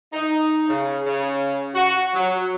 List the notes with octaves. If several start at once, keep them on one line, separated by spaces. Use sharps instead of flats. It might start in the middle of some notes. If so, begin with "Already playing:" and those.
D#4
C#3
C#3
F#4
F#3